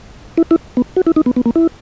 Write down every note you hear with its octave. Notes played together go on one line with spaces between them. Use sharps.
E4
E4
B3
F#4
E4
D#4
B3
B3
A#3
E4